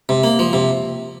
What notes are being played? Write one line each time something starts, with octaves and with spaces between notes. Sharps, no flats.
C3
A#3
F3
C3